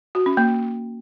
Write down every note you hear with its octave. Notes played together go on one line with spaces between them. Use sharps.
F#4
C#4
A#3